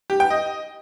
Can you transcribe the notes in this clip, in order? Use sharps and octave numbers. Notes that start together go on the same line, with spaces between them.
G4
G5
D#5